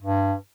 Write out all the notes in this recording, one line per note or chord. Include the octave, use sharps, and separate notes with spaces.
G2